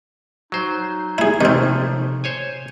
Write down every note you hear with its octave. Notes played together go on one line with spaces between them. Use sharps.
F#3 D#4 C5
E4 G#4
C3 D#3 F3 A3 C4
C5 C#5 G#5